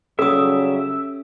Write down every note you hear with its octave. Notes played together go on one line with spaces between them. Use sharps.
C#3 F#3 G3 C#4 G4 A4 E5 D#6